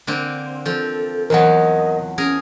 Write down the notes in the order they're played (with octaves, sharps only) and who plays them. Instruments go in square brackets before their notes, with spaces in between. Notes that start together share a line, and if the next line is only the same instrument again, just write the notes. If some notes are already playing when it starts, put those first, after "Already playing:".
[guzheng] D3 A#3 C4
[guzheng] F3 C4 [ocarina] A4
[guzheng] E2 F3 F#3 [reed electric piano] A#4 F#5 [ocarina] D#5
[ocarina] C#4 [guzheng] G#4 A#4